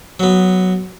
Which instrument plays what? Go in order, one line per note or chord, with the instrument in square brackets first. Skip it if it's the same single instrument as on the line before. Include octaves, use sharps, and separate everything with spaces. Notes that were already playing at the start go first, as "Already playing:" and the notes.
[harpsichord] F#3 B3